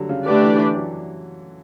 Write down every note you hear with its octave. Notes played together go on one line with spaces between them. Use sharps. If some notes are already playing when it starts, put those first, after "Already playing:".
Already playing: D3 F#3 G3
C#3
D3 A3 D4 G4 B4 D5
E3
E3
F#3